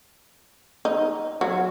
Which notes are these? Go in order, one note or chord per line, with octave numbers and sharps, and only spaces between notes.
D#4
F#3